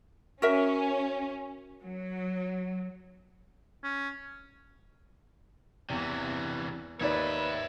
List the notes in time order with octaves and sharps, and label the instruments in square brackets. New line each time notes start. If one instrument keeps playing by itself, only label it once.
[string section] C#4 [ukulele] F#4 A#4 E5
[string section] F#3
[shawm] C#4
[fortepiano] E2 [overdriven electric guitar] C3 E3
[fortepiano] D#2 D#4 D5 [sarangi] B4 [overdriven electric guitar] C#5 E5